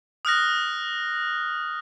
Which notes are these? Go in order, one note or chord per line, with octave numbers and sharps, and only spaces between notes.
D#6 F6 F#6 A#6